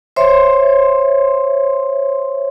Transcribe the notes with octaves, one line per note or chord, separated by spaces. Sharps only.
C5 C#5 E5 C6